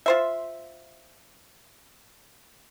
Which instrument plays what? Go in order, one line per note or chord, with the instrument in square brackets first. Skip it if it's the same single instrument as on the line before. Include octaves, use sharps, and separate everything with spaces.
[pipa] F4 C5 E5